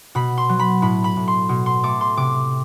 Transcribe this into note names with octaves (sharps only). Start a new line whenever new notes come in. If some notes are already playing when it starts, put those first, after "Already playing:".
B2 B5
C6
F#3
B5
A2 B5
B5
A2
C6
B2
C6
A3 D6
C6
C3 D6